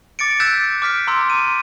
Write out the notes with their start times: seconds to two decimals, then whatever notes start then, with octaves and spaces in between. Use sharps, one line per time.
0.19 D6 A6 C#7 D7
0.40 E6 F#6 G6 A6 B6 E7
0.82 D6 F6 B6 D7
1.07 A#5 C6 E6
1.30 D#7